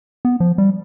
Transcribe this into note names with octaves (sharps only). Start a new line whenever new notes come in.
B3
F3
G3